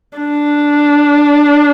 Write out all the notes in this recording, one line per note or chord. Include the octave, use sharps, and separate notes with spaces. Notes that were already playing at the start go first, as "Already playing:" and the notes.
D4